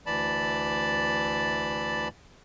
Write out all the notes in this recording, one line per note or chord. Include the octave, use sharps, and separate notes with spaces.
D2 E3 D5 A5 B5